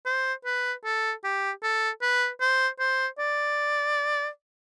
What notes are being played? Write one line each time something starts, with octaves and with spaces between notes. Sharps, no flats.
C5
B4
A4
G4
A4
B4
C5
C5
D5